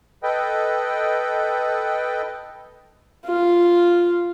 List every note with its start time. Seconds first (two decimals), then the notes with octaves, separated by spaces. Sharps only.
0.23 A4 B4 D#5 G5
3.26 F4